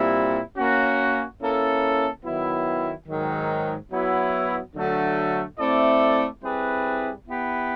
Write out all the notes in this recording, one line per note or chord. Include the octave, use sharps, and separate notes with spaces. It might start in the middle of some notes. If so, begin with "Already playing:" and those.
Already playing: A#2 G3 C4 E4
A#3 C#4 F#4
A#3 C#4 E4 A4
D#3 F#3 B3 E4
G#2 D#3 F#3
F#3 B3 E4
D3 F#3 A3
A3 C4 E4 A4 D5
G3 C4 E4 G#4 B4
B3 E4 G4 B4